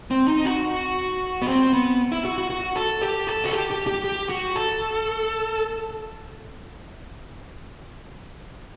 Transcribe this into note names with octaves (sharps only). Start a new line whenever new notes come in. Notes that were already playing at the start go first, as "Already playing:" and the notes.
C4
D#4
F#4
B3
C4
B3
E4
F#4
F#4
F#4
A4
G4
A4
F#4
G4
G4
G4
G4
F#4
A4